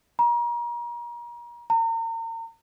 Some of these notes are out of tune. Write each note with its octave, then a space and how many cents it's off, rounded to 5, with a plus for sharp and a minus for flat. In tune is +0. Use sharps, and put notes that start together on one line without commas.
A#5 +35
A#5 -40